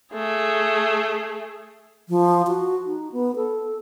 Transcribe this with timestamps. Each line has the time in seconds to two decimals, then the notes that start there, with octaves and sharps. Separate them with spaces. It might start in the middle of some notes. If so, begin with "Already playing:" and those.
0.14 A3 G#4
2.09 F3
2.47 F#4
2.86 D#4
3.12 B3
3.36 A4